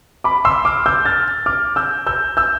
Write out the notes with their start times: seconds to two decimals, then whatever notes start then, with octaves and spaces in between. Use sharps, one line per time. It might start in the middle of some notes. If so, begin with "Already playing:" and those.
0.24 B5 D6
0.45 C6 E6
0.65 D6 F6
0.86 E6 G6
1.05 F6 A6
1.46 D6 F6
1.76 E6 G6
2.07 E6 G6
2.37 E6 G6